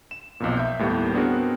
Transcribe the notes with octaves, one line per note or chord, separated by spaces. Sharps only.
E7
B1 F2 A#2
E5 G6
D#2 A2 G3 A#3 B3
B3 C4 D4 F#4 G#4 A#4